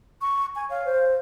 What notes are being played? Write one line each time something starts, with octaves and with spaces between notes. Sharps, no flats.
C#6
G#5
C#5 F5
C5